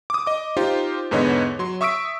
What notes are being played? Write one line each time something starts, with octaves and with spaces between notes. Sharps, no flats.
D6 D#6
D#5 D6
D#4 F4 G4 C5
E2 G#2 D3 B3 C#5 D#5
F#3 C6
E5 C#6 D#6 E6 B6 D7